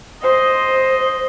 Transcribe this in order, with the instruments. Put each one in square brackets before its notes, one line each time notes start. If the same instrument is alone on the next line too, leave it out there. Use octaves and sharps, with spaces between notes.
[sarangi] C5 [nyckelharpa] D#5